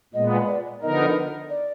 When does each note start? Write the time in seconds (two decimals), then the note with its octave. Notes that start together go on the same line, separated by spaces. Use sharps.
0.14 A#2 G#3 B3 D#5
0.48 D5
0.82 D3 F3 B3 D#4 A#4 D#5
1.50 D5